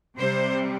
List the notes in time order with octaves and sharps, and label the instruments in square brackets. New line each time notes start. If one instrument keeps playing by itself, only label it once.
[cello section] C3 G3 C4 C5